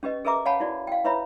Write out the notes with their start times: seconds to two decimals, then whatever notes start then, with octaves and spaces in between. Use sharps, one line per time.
0.03 C#4 G4 B4 D#5
0.25 G#4 A#4 B4 E5 A#5 D6
0.46 C#5 F5 F#5 G#5 A5 B5
0.60 E4 F#4 D5
0.87 F5 G5
1.05 E4 B4 C#5 E5 A#5 B5